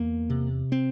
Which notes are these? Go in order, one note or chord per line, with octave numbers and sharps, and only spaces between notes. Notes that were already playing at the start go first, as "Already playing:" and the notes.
Already playing: E2 A#3
C3
C4